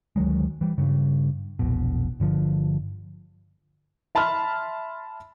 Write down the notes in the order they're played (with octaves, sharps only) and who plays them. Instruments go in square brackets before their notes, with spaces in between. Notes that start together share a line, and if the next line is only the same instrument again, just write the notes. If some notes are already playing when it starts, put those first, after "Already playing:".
[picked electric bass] D2 D#3 F#3 G#3
E3 G3
G2 C#3
E1 A#1 B2
G1 D3 F3
[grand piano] E5 A5 B5 C6 F6